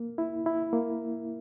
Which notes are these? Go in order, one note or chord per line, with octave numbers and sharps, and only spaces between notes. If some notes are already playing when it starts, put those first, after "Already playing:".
Already playing: A#3
E4
E4
A#3